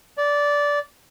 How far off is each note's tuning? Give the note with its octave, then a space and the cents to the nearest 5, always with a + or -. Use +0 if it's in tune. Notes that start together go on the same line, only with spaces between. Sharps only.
D5 -15